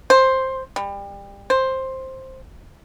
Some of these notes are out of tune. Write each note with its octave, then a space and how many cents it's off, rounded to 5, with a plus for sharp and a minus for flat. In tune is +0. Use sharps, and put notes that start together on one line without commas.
C5 +10
G3 +30
C5 +10